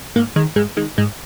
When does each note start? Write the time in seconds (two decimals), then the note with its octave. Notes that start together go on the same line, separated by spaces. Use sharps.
0.16 G#2 A#3
0.36 D#3 G#3
0.56 G#2 G#3
0.77 D#3 G#3
0.98 G#2 G#3